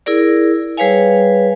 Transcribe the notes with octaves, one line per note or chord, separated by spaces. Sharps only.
E4 G#4 A#4 D5
G3 G#4 B4 C#5 F5 G#5